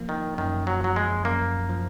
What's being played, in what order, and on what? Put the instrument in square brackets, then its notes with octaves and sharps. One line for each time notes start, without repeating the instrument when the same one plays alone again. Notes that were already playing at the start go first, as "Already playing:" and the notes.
Already playing: [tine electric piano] F3 A#3
[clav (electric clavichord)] D#3
[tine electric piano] F#2 [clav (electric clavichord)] D#3
[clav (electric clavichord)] F#3
[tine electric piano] F3 [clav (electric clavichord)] F#3
[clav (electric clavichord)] G#3
[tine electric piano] F#2 [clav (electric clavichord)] A#3
[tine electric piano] F3